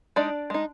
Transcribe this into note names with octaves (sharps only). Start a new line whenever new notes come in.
G#3 D4 D#4 D5
G#3 D#4